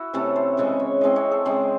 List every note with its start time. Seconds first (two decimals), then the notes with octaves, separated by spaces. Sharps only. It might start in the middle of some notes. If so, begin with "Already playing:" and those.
Already playing: E4 F#4
0.14 C3 E3 A3 C#4 A4
0.36 C5
0.57 C#3 E3 G#3 C#4 C#5
0.80 C#5
1.01 E3 G#3 C4 D#5
1.16 C#5
1.31 A4
1.45 C#3 G#3 C4 G#4